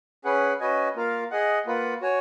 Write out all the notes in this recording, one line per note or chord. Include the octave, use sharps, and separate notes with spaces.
C#4 G#4 B4 F#5
C#4 F#4 B4 D#5 G#5
A#3 F4 A#4 F5
G#4 D#5 F#5
A#3 F4 B4 F#5
F#4 C#5 G#5